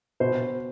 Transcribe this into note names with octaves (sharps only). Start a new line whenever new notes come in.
B2 C5